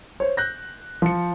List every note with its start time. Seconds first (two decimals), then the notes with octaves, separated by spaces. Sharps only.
0.20 C5 C#5
0.37 F#6 G6 A#6
1.02 F3 C#7